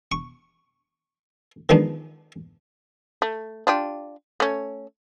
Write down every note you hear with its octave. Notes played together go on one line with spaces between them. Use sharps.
C#6
D#3 F3 G#3 B3 D4 D#4
A3
D4 F4 G4
A3 C#4